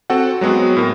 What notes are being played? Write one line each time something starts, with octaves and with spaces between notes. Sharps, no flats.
C4 F#4 A4 F#5
F#3 G#3 B3 C4 F#4
A2 A#4